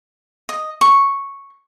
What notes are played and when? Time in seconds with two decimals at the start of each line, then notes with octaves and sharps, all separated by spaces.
0.49 D#5
0.81 C#6